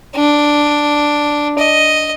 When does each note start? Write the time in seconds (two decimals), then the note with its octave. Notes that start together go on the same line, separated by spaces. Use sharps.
0.15 D4
1.58 D#5